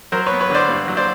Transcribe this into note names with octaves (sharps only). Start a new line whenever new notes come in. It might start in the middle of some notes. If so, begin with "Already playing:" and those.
F#3 A#4 C5
B3 B4 C#5
B4 C#5
D3 C5 D5
G2
F#3
C5 D5